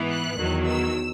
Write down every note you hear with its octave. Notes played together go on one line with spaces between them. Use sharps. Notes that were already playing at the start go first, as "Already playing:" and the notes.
Already playing: G#2 E3 B3
F#6
E2 D#3 F#3
E6